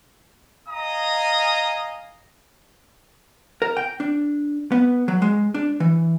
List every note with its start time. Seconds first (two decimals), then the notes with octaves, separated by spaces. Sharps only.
0.69 D#5 F5 G#5 A#5 D#6
3.62 A#4
3.77 G5
4.00 D4
4.72 B3
5.08 F#3
5.22 G#3
5.54 D4
5.80 E3